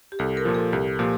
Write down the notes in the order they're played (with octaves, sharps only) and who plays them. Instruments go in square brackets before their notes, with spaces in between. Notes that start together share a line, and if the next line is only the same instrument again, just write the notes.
[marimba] G4
[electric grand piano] C2 [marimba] A4
[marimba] A#4
[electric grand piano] A#2 F3
[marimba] A4
[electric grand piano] C2 [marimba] G4
[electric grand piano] A#2 F3 [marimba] G4